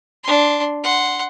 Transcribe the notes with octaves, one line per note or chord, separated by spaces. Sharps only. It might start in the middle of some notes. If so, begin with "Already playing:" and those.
D4 C6
F#5 C6